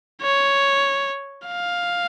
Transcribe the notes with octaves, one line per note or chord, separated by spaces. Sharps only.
C#5
F5